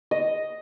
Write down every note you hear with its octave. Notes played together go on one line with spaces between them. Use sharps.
D#5